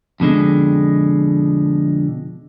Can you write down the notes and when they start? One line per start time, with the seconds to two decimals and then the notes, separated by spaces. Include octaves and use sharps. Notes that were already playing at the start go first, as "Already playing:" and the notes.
0.20 F2 B2 D3 G#3